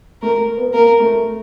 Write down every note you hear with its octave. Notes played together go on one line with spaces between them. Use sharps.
A3 A#4
B3
A#3 A#4
A3